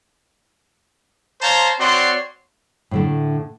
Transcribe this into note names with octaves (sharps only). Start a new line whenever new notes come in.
C5 C#5 F5 A5 A#5 C6
C4 F#4 C#5 D5 C6
A2 D3 A3